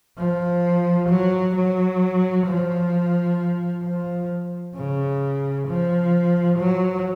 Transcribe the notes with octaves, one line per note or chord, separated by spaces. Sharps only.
F3
F#3
F#3
F3
F3
C#3
F3
F#3